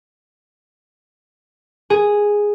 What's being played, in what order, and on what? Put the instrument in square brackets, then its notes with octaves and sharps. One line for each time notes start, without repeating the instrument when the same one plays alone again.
[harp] G#4